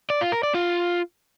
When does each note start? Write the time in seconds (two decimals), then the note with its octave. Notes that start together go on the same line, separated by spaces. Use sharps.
0.10 D5
0.21 F4
0.32 A#4
0.43 D5
0.54 F4